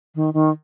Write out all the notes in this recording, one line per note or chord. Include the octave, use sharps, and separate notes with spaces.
D#3
D#3